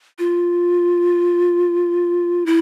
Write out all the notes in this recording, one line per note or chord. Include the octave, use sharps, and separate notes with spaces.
F4
E4